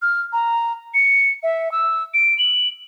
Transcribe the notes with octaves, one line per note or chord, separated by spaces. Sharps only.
F6
A#5
C#7
E5
E6
D7
F#7